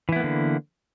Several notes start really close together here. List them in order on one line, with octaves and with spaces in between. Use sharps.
E3 E4 B3 A#3 D3